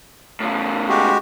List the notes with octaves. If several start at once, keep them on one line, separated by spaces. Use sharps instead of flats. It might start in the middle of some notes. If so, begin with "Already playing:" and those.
A2 C#3
G#3 F#4 G4